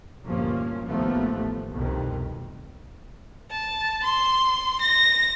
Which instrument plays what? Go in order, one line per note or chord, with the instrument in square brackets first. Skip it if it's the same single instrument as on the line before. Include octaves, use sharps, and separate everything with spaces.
[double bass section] D2 G2 A#2 F3 A#3 C#4
A1 D#2 F3 A3 B3
C2 F2 B2 D#3
[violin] A5
C6
A#6